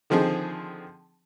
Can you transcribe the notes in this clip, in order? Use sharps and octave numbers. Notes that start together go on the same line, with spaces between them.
D3 D#3 F3 C4 G#4